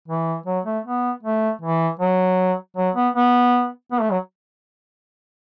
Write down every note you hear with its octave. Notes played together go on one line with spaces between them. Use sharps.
E3
F#3
A3
B3
A3
E3
F#3
F#3
B3
B3
B3
A3
F#3